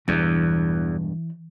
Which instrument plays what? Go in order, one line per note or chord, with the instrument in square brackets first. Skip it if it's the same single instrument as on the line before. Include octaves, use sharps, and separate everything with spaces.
[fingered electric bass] E1 G2 [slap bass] E2 [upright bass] E3